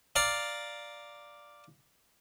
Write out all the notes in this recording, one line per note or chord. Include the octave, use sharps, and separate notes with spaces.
D5 F5 A#5